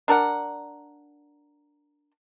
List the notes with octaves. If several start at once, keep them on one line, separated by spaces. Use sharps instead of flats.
D4 A#4 D5 F#5